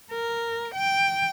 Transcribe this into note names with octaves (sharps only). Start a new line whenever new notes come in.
A#4
G5